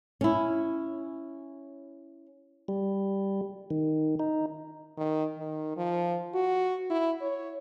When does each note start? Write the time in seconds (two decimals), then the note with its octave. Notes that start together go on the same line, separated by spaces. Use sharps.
0.21 C#4 E4
2.68 G3
3.71 D#3
4.19 D#4
4.97 D#3
5.38 D#3
5.77 F3
6.34 F#4
6.90 E4
7.21 C#5